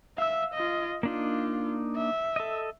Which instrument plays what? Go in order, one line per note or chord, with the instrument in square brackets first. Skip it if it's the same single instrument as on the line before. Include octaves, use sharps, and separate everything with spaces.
[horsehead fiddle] E5 [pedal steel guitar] F5 E6
[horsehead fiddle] F4 D#5
[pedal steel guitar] A#3 D4 D#4 [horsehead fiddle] F4
[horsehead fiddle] E5
[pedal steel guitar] A4 D#5